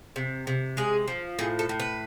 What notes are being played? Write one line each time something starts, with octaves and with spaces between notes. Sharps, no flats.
C3
C3
G#3 G#4
F3
A2 G#4
A4
A2
B4